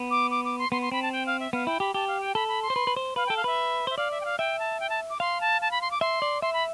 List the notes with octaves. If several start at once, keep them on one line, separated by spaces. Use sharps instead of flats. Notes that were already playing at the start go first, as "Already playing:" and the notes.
Already playing: B3
D6
D6
D6
C6
B3 C6
C6
C4 B5
A5
G5
F5
E5
B3 F5
E4 G5
G4 B5
G4 A5
F5
G5
A4 B5
B5
C6
C5
B4
B4
C5
B4 F5
A4 G5
F5
B4 E5
C5 E5
D5 F5
E5
G5
F5
E5 G5
A5
G5
A5
D6
F5 C6
A5
A5
B5
C6
D6
E5 C6
D5
E5 C6
B5